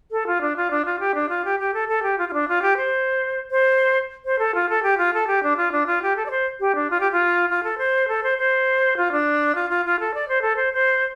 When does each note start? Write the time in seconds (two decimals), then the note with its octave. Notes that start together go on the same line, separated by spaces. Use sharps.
0.11 A4
0.27 F4
0.41 D4
0.57 F4
0.71 D4
0.85 F4
1.00 G4
1.15 D4
1.29 F4
1.45 G4
1.59 G4
1.74 A4
1.88 A4
2.03 G4
2.18 F4
2.29 F4
2.34 D4
2.48 F4
2.62 G4
2.77 C5
3.51 C5
4.25 C5
4.39 A4
4.55 F4
4.69 A4
4.83 G4
4.98 F4
5.14 A4
5.27 G4
5.43 D4
5.57 F4
5.72 D4
5.87 F4
6.02 G4
6.16 A4
6.26 D5
6.31 C5
6.60 G4
6.75 D4
6.90 F4
7.00 G4
7.12 F4
7.50 F4
7.64 A4
7.78 C5
8.08 A4
8.23 C5
8.38 C5
8.97 F4
9.12 D4
9.55 F4
9.70 F4
9.85 F4
10.00 A4
10.14 D5
10.29 C5
10.42 A4
10.56 C5
10.73 C5